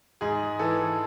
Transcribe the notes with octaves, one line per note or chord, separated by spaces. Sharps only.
G#2 G#4
E3 A4